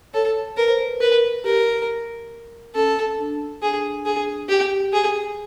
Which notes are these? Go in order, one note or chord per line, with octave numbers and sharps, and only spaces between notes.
A4 C#5
A#4 B4
C5
B4
A#4 B4
G4 A#4
C#4 A4
D4
D4 G#4
G#4
G4
G#4